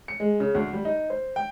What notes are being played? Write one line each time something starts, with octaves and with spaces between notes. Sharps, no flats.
C#7
G#3
C#3
D2
G3
D#4
C5
G5